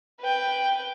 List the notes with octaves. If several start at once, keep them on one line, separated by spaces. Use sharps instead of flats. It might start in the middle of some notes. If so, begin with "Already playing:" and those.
B4 G5